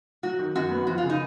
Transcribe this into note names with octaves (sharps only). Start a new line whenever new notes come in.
F#3 F#4
D#3
F#2 F#4
B3
F3 F#4
F4
C#3
D#4